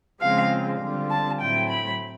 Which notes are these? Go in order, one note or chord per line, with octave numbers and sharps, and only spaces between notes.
C#3 F3 G#3 C4 F4 F5
D3 G3 C4 F4
A5
A2 F#3 A3 C4 E4 G5
B5